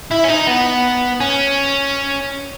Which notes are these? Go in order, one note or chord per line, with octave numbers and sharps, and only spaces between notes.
E4
C#4
D#4
B3
C#4